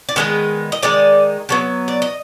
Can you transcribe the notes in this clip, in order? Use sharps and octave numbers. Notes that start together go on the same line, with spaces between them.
D5
D#3 G#3 B3 D#4 B4
D#5
D#3 G#3 D#4 D5
D3 F#3 B3
D5
D#5